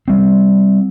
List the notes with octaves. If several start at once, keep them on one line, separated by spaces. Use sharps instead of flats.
G3 C4